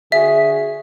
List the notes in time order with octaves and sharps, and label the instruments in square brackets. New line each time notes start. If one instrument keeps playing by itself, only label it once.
[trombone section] D3 F#4 G#4 [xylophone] E5